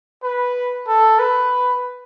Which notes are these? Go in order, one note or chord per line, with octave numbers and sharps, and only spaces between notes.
B4
A4
B4